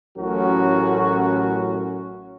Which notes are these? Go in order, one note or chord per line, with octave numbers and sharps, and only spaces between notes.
A1 A2 F#3 C#4 F#4 A#4